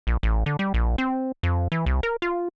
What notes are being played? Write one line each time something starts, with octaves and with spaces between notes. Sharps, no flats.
A#1
A1
D3
G3
A#1
C4
F2
E3
C2
A#4
F4